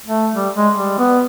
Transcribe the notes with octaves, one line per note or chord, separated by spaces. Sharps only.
A3
G3
G#3
G3
B3